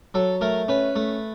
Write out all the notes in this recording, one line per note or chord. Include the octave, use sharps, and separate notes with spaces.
F#3 A4
A3 A#4
C#4 B4
A3